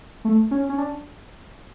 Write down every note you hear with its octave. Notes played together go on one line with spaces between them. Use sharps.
A3
C#4
C#4
D4